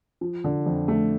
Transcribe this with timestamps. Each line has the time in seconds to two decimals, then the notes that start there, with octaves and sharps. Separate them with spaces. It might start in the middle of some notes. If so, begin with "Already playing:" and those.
0.21 F3
0.44 D3
0.66 F2
0.88 A3